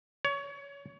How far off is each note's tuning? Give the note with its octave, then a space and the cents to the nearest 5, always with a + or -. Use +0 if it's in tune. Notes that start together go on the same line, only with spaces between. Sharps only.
C#5 +25